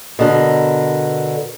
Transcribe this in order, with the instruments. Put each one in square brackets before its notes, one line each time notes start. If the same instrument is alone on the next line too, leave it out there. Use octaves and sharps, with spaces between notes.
[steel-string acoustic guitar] B2 D3 A#4